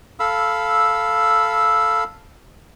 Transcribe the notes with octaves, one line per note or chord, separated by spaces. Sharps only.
A4 F5 B5 E6